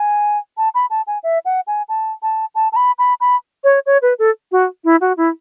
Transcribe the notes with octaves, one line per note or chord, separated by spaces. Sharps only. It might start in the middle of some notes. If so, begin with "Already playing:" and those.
Already playing: G#5
A5
B5
A5
G#5
E5
F#5
G#5
A5
A5
A5
A5
B5
B5
B5
C#5
C#5
B4
A4
F#4
E4
F#4
E4